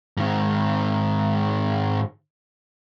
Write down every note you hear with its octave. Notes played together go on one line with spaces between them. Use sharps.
G#2 D#3